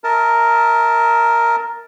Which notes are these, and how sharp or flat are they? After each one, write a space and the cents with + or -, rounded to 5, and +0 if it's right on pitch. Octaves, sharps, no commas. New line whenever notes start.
A#4 +0 E5 -40 A5 +0